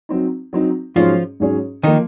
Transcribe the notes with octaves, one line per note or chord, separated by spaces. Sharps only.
F#3 C4 D#4
F#3 C4 D#4
G#2 F3 F#3 C#4 F4 G#4 C#5
G#2 F#3 C#4 G#4 C#5
D#3 F3 A#3 D#4